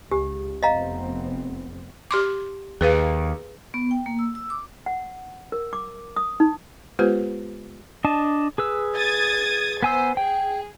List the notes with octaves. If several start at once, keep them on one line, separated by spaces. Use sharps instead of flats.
C#2 G4
F1 B3 C4 D#5 F5 A#5
G4 C6 D6
D#2 G#4 B4 F5
B3
G5
A#3
E6
E6
D6
F#5
A#4
D6
D#6
D#4
G#3 B3 F4 G4 B4 C5
D4 D#5 A5
G#4 B4 E6
D#6 G#6 A6
B3 C5 G#5 E6
G#4 G5